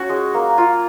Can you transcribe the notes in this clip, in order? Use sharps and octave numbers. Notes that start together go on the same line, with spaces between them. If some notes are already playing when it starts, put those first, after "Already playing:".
Already playing: C#4 F#4
G#3
A#3
F4